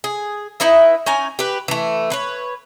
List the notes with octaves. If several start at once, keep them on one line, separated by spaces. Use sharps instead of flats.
G#4
D#4 E4 B4 E5
C#4 D#4 G#5
G4 B4
E3 A3
B4 C#5